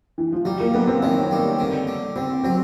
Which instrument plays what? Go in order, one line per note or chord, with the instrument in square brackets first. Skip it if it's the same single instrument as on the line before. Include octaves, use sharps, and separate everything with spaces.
[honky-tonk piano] E3
F3
[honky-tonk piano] F#3 [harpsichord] G3
[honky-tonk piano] A#3
[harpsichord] F#2 [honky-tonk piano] B3
[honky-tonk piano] C4
[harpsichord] D#3 [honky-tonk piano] C#4
[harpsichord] G3
D3
D3
[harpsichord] D3 [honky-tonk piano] C4
[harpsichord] F#3 [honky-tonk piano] C4